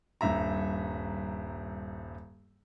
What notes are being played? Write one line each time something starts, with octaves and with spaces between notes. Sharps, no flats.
D#1 G2 E5 A#5